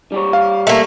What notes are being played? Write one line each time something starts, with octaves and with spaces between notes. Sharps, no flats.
G3 G4 C#5
F5
A3 A#3